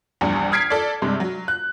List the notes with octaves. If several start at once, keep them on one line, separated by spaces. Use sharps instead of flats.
A#1 E2 G2 G#5
D#6 F6 G#6 B6 C7 D7
A4 D5
G2 C3 G#3
F#3
F#6